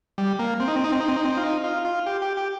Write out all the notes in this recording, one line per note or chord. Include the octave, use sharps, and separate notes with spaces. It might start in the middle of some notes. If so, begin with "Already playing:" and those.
G3
A#3
C4
D#4
C4
D#4
C4
D#4
C4
D#4
C4
F4
D#4
F4
F4
G4
G4
G4